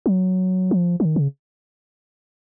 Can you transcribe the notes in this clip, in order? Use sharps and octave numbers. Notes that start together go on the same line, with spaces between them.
F#3
F3
F3
D#3
C#3